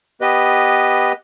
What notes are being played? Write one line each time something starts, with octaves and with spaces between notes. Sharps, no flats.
B3 G4 B4 D#5